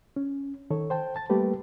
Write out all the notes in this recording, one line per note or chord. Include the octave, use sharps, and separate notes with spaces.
C#4
D#3 A4 C#5
C5 G5 A5
A5 A6
G3 A3 A#3 G4 B4